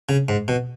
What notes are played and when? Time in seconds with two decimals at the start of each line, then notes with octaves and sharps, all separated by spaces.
0.09 C#3
0.29 G#2
0.48 B2